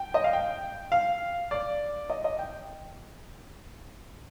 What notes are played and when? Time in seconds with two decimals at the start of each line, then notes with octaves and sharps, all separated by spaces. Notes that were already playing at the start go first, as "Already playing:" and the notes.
Already playing: G5
0.14 D#5
0.24 F5
0.33 G5
0.92 F5
1.51 D5
2.10 D#5
2.24 D#5
2.39 G5